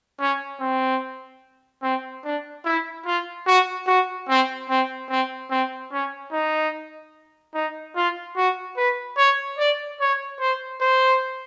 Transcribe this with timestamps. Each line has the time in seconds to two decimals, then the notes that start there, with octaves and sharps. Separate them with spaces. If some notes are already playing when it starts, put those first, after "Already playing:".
0.20 C#4
0.60 C4
1.83 C4
2.24 D4
2.65 E4
3.06 F4
3.47 F#4
3.87 F#4
4.29 C4
4.69 C4
5.09 C4
5.50 C4
5.92 C#4
6.32 D#4
7.54 D#4
7.96 F4
8.36 F#4
8.77 B4
9.17 C#5
9.58 D5
10.00 C#5
10.40 C5
10.81 C5